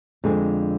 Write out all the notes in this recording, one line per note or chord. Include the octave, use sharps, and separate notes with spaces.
F2 D3 G#3 C4